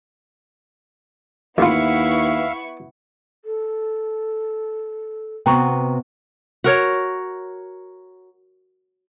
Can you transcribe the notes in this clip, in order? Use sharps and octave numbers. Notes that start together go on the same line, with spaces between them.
A1 D#2 B3 E4 F4 E5 F5 C#6
A4
C3 B3 F#4 G5 A#5 C#6
F#4 A#4 C#5